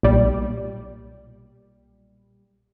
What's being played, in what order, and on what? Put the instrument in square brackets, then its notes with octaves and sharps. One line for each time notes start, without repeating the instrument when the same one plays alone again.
[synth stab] B1 A#2 G3